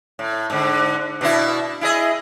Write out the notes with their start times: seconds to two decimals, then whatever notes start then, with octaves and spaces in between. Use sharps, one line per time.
0.19 A2
0.50 G#2 D3
1.21 B2 D4 E4
1.81 E4 G#4 D#5